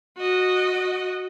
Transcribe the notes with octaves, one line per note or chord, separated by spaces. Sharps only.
F#4 D#5